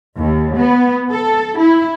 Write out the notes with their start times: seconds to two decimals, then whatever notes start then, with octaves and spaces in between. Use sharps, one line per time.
0.18 D#2
0.58 B3
1.11 A4
1.57 E4